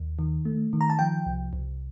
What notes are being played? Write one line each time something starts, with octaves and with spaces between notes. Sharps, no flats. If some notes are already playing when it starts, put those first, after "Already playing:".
Already playing: D#2
D#3
A3
D#3
A#5
A5
F3 G5
C2
C2